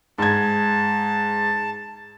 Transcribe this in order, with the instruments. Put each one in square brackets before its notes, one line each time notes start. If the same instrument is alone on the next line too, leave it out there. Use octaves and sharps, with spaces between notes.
[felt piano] G#2 G#6 [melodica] A5